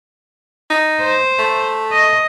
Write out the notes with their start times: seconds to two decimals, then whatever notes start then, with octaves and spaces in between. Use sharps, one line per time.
0.70 D#4
1.01 C5
1.39 A3
1.92 D#5